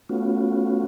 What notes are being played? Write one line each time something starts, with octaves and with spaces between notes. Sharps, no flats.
A3 B3 C#4 F4 F#4